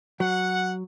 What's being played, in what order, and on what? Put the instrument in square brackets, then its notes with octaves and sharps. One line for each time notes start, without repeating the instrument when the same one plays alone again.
[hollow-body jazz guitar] F#3 [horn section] F#5